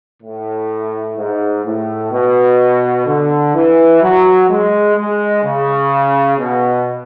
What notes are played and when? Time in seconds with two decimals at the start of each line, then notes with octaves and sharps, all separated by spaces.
0.22 A2
1.17 G#2
1.65 A2
2.11 B2
3.06 D3
3.55 E3
4.02 F#3
4.50 G#3
4.96 G#3
5.43 C#3
6.38 B2